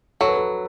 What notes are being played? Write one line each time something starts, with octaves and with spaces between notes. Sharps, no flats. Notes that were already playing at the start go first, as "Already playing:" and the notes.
F#3 A4
B4
A4